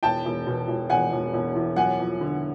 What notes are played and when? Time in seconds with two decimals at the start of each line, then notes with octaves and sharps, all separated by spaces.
0.03 E1 G5 A5
0.25 E1
0.46 B2
0.68 E1
0.90 E1 F#5 G#5
1.12 E1
1.33 E1
1.55 E2
1.76 F#3 F#5 G#5
1.99 F2
2.21 D3